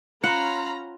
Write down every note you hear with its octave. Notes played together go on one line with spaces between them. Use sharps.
C#4 F4 C5 F5 F#5 A#5 B5